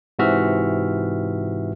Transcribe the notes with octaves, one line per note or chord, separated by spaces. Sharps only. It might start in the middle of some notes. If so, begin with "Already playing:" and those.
G#2 C3 E3 F#4 E5 F6